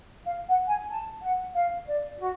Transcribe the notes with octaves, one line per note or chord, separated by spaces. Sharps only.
F5
F#5
G#5
A5
F#5
F5
D5
F#4